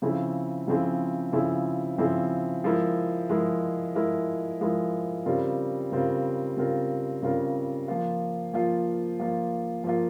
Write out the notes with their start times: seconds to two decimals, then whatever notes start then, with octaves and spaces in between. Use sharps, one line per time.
0.02 C#3 F3 C4 E4 G#4
0.67 C#3 F3 C4 E4 G#4
1.33 C#3 F3 C4 E4 G#4
1.98 C#3 F3 C4 E4 G#4
2.64 F3 G#3 E4 A#4
3.29 F3 G#3 E4 A#4
3.95 F3 G#3 E4 A#4
4.61 F3 G#3 E4 A#4
5.26 C#3 G3 C4 F4 A#4
5.92 C#3 G3 C4 F4 A#4
6.57 C#3 G3 C4 F4 A#4
7.22 C#3 G3 C4 F4 A#4
7.88 F3 A#3 F4
8.53 F3 A#3 F4
9.19 F3 A#3 F4
9.84 F3 A#3 F4